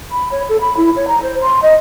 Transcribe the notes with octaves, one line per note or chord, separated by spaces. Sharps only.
B5
C#5
A4
B5
E4
C#5
A#5
C5
C6
D#5